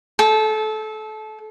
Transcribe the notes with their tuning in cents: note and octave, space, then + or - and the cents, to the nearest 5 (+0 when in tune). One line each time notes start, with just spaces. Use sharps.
A4 -25